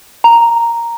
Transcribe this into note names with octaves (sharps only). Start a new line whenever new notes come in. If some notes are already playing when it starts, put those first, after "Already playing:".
A#5